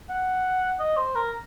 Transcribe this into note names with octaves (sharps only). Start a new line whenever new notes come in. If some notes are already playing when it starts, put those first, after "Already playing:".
F#5
D#5
C5
A#4